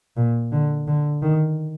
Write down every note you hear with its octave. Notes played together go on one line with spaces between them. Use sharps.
A#2
D3
D3
D#3